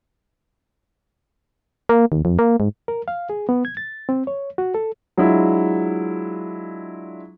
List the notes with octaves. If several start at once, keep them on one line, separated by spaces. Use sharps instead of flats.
A#3
D#2
F2
A#3
G#2
A#4
F5
G#4
B3
G#6
A6
C4
C#5
F#4
A4
F#3 G#3 D4 E4 F4